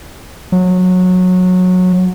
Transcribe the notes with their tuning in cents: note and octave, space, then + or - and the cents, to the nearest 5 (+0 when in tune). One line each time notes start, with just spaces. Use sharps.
F#3 -20